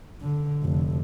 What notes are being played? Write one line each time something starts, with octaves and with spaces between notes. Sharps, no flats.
D3
F1 D3